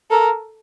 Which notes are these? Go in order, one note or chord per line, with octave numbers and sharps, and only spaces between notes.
A4 A#4